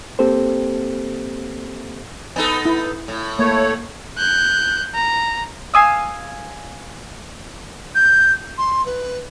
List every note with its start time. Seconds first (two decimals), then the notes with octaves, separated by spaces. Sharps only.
0.19 A#3 C4 G4 A4 C5
2.36 B3 D#4 A4 G#5
2.65 E4
3.08 A2
3.39 A3 A#3 C#5
4.18 F#6 G6
4.95 A#5
5.74 F5 G#5 D#6 E6
7.95 G6
8.58 C6
8.86 B4